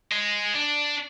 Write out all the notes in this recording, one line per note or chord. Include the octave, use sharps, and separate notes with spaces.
G#3
D4